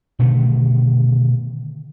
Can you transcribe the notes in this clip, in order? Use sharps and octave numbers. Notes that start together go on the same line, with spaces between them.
B2 D3 D#3 A3